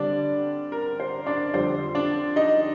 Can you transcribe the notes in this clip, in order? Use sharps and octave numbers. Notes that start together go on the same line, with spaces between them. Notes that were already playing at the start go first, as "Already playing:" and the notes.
Already playing: D3 G3 C4 D4 D5
A#4
C5
D4 D5
F2 D3 G3 C5
D4 D5
D#4 D#5